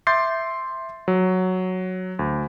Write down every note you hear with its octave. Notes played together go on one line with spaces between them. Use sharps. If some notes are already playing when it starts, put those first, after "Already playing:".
E5 C6 D6 G6 A6 C7
F#3
D2